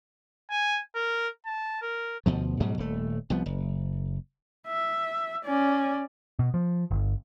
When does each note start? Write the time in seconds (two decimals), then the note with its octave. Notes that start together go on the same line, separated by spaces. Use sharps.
0.50 G#5
0.95 A#4
1.46 A5
1.82 A#4
2.26 D2 B2 F3
2.60 G#2 B2 F#3 G3
2.78 D#1 A3
3.30 C2 F3 B3
3.46 F#1
4.67 E5
5.44 C#4 D5
6.39 B2
6.54 F3
6.91 G1